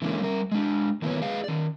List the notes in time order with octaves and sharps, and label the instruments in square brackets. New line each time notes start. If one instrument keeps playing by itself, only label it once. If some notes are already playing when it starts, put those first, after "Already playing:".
[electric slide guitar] D3 E3 G#3 A#3 C#4
G3 A#4
G#3 D4
D#3 E3 A#3 B3 B4 C#5
G#4 B4 F5
D#3 D5